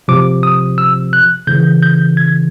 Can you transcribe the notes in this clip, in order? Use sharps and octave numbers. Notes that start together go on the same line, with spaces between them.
C3 F3 D6
D#6
E6
F#6
C#3 E3 G6
G6
G#6